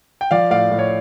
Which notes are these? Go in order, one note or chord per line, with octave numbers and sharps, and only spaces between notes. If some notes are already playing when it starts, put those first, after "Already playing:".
G5
F3 D5 F5
A2 D5 F5
A2
C#5